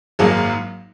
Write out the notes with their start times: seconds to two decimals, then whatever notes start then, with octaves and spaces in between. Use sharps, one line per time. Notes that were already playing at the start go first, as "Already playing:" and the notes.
0.19 G#1 F#2 D#3 F#3 A#3 G#4